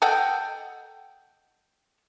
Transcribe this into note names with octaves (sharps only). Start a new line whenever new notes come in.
A4 D#5 F#5 G5